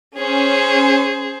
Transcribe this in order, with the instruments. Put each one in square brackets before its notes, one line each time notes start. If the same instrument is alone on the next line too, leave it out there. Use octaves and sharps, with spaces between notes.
[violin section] C#4 [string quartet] G#4 C5